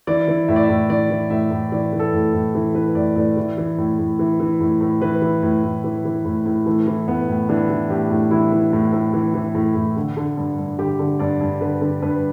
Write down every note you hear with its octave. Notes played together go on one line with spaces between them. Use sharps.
E3 D5
E3
A2 E5
D5
E5
A2
E3 D5
E3
A2 E5
A2
E3 D5
E3
A4
A2
A2
E3 A4
E3 B4
A2 D5
A2 D5
E3
E3
A2
A2
E3
E3
A2
A2
E3 B4
E3
A2
A2
E3
E3
A2
A2
E3 A3
E3
A2 B3
A2
E3 D4
E3
A2 G4
A2
E3 E4
E3
A2
A2
E3
E3
A2
A2
D3
D3
G2
G2
D3 G4
D3
G2 D5
G2
D3 B4
D3
G2 B4